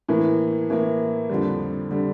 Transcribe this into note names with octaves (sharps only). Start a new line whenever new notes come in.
A2 E3 A#3
A2 E3 A#3
F2 D3 G3
D3 G3